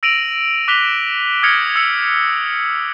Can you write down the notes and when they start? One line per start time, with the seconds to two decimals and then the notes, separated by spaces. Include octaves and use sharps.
0.03 E6 A#6 D7 D#7 F7 F#7
0.68 D6 F#6 B6 F7 G7
1.43 D#6 F6 G#6 A#6 C#7 F#7
1.76 E6 G#6 C#7